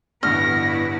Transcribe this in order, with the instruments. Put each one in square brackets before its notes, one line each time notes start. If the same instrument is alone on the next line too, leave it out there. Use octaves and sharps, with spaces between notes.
[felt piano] A1 D2 G2 [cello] B3 E4 [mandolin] F6 [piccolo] A#6